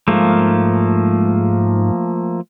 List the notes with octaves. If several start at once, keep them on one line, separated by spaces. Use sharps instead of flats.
G#2 F3 A3 A#3